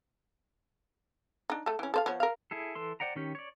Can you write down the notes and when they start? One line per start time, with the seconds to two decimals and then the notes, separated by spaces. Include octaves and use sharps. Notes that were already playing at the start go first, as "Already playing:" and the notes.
1.50 D4 D#4
1.66 A3 A4
1.79 E3 C#4
1.94 A4 C5 F5
2.06 F3 B3 C#5
2.20 A#4 F5
2.51 E4 G#4 A4
2.75 E3 A4 C6
3.00 C5 D5 F#5 G5 A#5
3.16 D#3 C#4 G4
3.35 C#5 D5